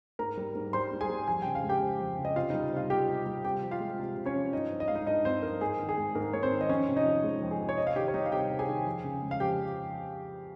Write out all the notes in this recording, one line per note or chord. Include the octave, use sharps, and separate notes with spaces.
G#2 A#4 A#5
G3
G#2
G3 C5 C6
G#2
G#4 G#5
G3
F2 G#5
C#3 G5
F5
G#3
G4 G5
F2
F2
C#3
D#5
C3 F4 F5
G3 D#4 D#5
C3 F4 F5
G3 G4 G5
C3
G3
C3 G4 G5
F3
F4 F5
G#3
C3
C3
C#4 C#5
F3
G2 D#4 D#5
F3
D#5
G#3 F5
D#4 D#5
G2 D#4 D#5
G2 C4 C5
F3 A#4
G#2 G#4
D#3
G#4
G#3
G#2 A#4
G#2 C#5
C4 C5
D#3
D#5
F2 C#4 C#5
C3
D#4 D#5
F3
G#3
F2
G#4
C3
C#5
C3 D#5
F5
D#3 G4 G5
C#5
G3 D#4 D#5
F5
C3 G4 G5
C3
G#4 G#5
D#3
F2
C#3
G#3
F5
F2 G4 G5